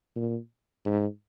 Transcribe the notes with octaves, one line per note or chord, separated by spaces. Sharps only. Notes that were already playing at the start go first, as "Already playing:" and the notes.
A#2
G#2